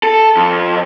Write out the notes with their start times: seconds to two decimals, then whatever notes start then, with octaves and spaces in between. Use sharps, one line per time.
0.03 A4
0.37 F2